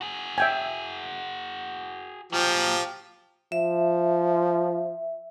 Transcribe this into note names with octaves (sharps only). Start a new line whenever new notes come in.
F#4 G#4
E5 G5 G#5
A#2 F3 F#3 G4
F3 E5